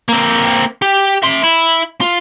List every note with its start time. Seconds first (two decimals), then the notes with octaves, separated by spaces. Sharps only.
0.09 A#3 C4
0.82 G4
1.23 E5 C6
1.44 E4
2.01 F4